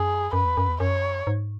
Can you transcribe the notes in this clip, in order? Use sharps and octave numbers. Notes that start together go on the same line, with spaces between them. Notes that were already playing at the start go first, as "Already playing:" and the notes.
Already playing: F#2 G#4
F#2 B4
E2
F#2
E2
F#2 C#5
G#2